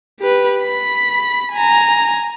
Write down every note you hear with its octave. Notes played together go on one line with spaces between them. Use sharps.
G4 B4
B5 B6
G#5 A#5